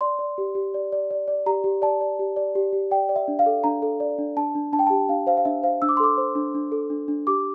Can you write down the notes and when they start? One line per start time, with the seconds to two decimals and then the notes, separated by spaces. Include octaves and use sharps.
0.01 D5 C6
0.19 D5
0.38 G4
0.55 G4
0.74 D5
0.92 D5
1.11 D5
1.28 D5
1.46 G4 A#5
1.64 G4
1.82 D5 A5
2.01 D5
2.19 G4
2.36 D5
2.55 G4
2.73 G4
2.91 D5 G5
3.09 D5
3.16 E5
3.28 D4
3.39 F5
3.46 A4
3.64 D4 A#5
3.82 A4
4.00 D5
4.18 D4
4.36 D4 A5
4.55 D4
4.73 D4 A5
4.79 G5
4.87 G4 A5
5.09 D4 F5
5.27 C5 F5
5.37 F5
5.45 D4 E5
5.63 C5 F5
5.82 D4 E6
5.89 D6
5.97 C6
6.00 A4 D6
6.18 C5
6.35 D4
6.55 D4
6.72 A4
6.90 D4
7.08 D4
7.27 G4 D6